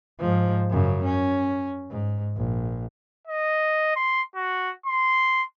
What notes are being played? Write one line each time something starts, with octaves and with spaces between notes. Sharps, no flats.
G#2 F3
F#2 C#3
C#4
G#2
A#1
D#5
C6
F#4
C6